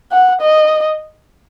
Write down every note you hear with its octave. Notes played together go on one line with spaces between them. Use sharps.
F#5
D#5